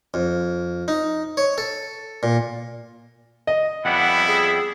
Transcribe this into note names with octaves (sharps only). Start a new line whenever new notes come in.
F2
D#4
C#5
A4
A#2
D#5
F2 G3 B3 E4 F#5
G#4